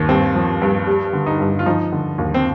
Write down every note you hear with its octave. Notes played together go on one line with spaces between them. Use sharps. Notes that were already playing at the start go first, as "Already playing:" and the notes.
Already playing: D#2 D#3
G2 C4
F3
G2
G3
D3
D#4
G2
F4
F3 D#4
D3
D#2
C4